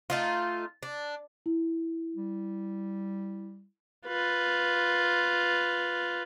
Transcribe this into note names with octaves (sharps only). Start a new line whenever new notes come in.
A3 D#4 F4
D4
E4
G3
F4 B4